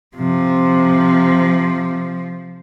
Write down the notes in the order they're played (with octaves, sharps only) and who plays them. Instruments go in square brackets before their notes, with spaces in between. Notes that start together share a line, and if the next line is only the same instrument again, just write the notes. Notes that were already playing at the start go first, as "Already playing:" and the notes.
[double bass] C3 [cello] F3